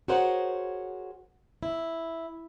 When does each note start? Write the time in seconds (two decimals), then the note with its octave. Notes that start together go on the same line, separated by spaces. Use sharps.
0.08 F#4 G#4 A#4 C5 C#5 F#5
1.63 E4